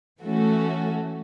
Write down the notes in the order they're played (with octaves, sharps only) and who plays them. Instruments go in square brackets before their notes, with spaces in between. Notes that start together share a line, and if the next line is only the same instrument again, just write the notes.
[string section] E3 A3 C#4 F#4 A4